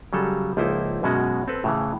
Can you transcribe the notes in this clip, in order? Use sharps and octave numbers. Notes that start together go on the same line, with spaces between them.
C#3 F#3 G3 A4
C#2 F3 A#3 D#4 E4 C5
F#2 B2 G#3 C#4 F#4
C4 A4 B4
A2 C#3 E3